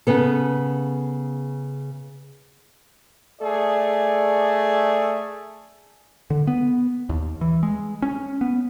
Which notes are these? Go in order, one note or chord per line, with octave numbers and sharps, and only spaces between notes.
C#3 B3 A4
A3 G#4 D5
D3
B3
D#2
E3
G#3
C#4
B3